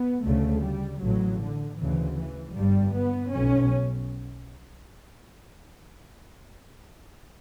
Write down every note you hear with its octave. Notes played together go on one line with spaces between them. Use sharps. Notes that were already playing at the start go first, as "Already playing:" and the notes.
Already playing: B3
D2 C#3 A3
G3
A1 A2 F#3
D3
D2 C#3 E3
E3
G1 G2 G3
B3
B1 B2 C#4